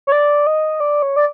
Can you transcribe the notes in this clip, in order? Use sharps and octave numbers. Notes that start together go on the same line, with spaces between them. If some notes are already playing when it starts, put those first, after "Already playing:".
C#5
D5
D#5
D5
C#5
D5